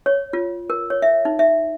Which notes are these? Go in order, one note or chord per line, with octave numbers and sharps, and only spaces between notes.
C#5
F4
A#4
C#5
E5
D#4
E5